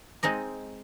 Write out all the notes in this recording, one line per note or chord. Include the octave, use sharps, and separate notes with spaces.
G#3 C4 D#4 D#5